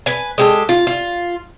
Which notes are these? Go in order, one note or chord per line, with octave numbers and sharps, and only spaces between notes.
B4 G#5
G#3 G4 A4
F4
F4